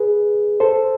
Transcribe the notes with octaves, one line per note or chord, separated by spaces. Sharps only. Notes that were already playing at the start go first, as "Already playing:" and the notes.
Already playing: G#4 B4
A4 C5